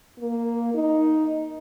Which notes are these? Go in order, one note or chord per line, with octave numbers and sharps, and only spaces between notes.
A#3
D#4